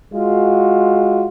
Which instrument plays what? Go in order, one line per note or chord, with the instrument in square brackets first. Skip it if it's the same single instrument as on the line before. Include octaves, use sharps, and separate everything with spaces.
[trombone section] G#3 F4 F#4